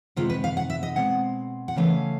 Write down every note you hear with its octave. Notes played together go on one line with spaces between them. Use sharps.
C3 D#3 G#3 B3 F4
B4
F5
F#5
E5
D#5
B2 G#3 C4 F#5
F#5
C#3 E3 A3 C#4 F5